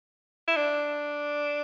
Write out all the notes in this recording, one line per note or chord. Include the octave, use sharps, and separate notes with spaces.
E4
D4